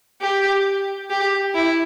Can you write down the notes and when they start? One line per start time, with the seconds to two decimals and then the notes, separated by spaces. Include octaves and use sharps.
0.21 G4
1.10 G4
1.55 E4